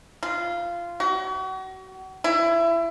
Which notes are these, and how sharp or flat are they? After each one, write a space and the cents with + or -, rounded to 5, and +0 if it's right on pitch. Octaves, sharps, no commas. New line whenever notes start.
F4 -15
F#4 +35
E4 +25